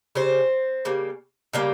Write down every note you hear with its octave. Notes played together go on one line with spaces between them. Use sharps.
C#3 G3 C4 C5
C#3 G3 A#3
C#3 G3 A#3